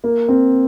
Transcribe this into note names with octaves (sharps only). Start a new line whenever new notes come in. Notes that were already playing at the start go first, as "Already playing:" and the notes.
A#3
C4